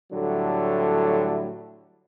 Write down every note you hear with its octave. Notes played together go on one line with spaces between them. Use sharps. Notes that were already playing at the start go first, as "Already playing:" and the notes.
A2 D3 F#3 G3 A3